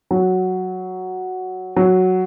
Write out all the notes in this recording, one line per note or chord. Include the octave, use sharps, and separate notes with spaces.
F#3
F#3